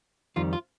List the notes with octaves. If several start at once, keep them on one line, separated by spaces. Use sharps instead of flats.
F2 D#3 G3 F4
F4